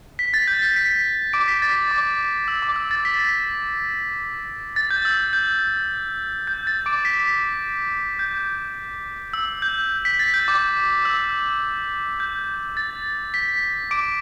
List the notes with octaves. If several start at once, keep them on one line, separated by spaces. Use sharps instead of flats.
B6
A6
G6
B6
B6
D6 D7
B6
A6
D6
E6
D6
E6
A6
B6
A6
G6
E6
G6
G6
A6
D6 D7
B6
G6
E6
G6
B6
A6
G6
D6
E6
G6
A6
B6
D6 D7